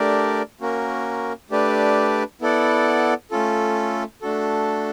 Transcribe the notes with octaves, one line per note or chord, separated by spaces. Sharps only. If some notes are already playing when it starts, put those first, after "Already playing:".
Already playing: A3 D4 G4 A#4 D5
A#3 C#4 F#4 A#4
A3 D4 G4 B4 D5
B3 E4 A4 D5 F#5
A3 C#4 F4 A4
A3 D4 F#4 A4